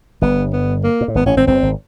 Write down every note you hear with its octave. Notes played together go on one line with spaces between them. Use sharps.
G1 G2 B3
B3
A#3
A#2
A2
G#1 G#2 B3
A1 A2 C#4
G#1 G#2 C4
G1 G2 C4
G#1